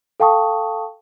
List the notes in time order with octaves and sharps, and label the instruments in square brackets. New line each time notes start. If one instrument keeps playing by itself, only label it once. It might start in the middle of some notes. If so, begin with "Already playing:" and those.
[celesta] A4 F5 G5 A5 C#6 D#6